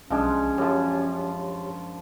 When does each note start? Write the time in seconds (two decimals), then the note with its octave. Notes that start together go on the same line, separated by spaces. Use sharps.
0.10 B1 F3 G#3 C#4 D4
0.58 F#2 F3 G4 C#5